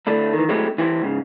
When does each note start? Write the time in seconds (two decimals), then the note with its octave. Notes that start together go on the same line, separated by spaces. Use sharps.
0.07 D3 A3 D4 E4
0.33 D#3 E3
0.49 F#3 G#3 A3 C4 E4 G4
0.78 E3 E4 G4 C5
1.03 G#2 C#3